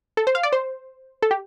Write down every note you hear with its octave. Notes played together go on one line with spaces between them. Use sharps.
A4
C5
F5
D5
C5
A4
G4